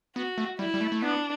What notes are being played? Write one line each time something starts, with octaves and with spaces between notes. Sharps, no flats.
B3 F#4
A3
G3 E4
G3
A3
A3
B3 D4